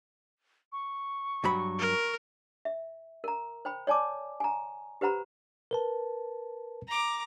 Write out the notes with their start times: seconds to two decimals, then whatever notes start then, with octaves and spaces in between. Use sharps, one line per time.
0.72 C#6
1.44 G2 F#3 B5
1.79 A#4
2.65 E5
3.24 A#4 A#5
3.65 C5 G5 B5
3.87 C#5 D5 G#5 A5 D6
4.40 G#5 A#5
5.01 G4 B4 C5 F#5 A#5 B5
5.71 A#4 B4 A5
6.88 A#5 D6